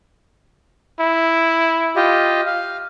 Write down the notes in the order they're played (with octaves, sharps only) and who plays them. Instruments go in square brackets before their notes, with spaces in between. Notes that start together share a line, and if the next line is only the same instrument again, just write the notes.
[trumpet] E4
[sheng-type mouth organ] F4 G4 D#5
F5